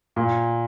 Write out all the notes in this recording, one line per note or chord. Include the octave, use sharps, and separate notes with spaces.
A#2